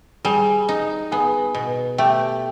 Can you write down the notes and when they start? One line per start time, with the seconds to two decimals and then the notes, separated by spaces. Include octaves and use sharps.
0.24 G3 G#4 G#5
0.69 D#4
1.11 B3 G#4 G#5
1.55 B2
1.98 A3 G4 G5